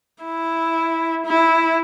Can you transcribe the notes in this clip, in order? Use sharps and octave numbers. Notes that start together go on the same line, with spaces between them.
E4
E4